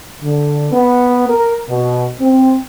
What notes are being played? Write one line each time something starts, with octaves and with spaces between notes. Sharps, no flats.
D3
B3
A#4
B2
C4